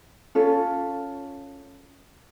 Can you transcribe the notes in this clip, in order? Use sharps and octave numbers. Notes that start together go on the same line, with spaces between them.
C#4 F4 A4